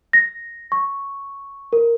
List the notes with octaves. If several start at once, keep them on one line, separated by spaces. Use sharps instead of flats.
A#6
C#6
A#4